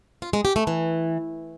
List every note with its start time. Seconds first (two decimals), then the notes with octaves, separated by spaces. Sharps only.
0.22 F4
0.33 G#3
0.45 G4
0.56 A3
0.67 E3